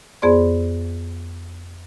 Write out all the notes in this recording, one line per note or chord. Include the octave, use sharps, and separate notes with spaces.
F2 B3 G#4 C5 D5 C6